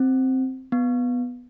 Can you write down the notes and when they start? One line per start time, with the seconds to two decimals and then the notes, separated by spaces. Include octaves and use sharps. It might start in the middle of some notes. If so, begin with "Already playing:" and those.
Already playing: C4
0.72 B3